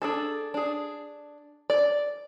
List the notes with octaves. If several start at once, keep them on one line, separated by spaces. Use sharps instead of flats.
D4 G#4 A4
D4 G#4
D5